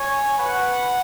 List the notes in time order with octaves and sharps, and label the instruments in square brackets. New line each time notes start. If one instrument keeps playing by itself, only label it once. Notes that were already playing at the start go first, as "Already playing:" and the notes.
Already playing: [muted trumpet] C#5 [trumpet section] G#5
[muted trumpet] B4 [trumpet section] F#5